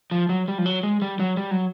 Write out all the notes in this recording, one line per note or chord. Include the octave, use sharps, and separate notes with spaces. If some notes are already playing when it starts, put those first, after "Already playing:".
F3
F#3
G3
F3
F#3
G#3
G3
F#3
G3
F#3